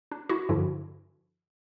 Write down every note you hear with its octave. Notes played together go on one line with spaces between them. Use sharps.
D4
E4 F#4
G2 D3 F3 E4 F#4